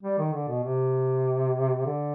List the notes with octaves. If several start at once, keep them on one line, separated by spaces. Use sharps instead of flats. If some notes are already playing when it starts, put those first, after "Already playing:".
G3
D#3
D3
B2
C3
D3